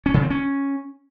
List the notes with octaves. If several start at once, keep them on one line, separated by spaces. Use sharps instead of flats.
C#4
C#3
C4
C#4